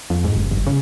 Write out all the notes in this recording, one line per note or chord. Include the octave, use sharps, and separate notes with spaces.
F2
G#2
F#1
G1
C#3